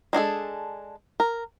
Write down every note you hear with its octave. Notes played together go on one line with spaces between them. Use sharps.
G#3 D4 G#4 A4
A#4